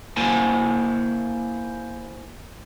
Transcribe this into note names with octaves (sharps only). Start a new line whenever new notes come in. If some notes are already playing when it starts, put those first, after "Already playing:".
A#3 E4 C5 G#5 A5